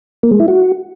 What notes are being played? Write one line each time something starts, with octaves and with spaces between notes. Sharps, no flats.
A#3
G#3
E4
F#4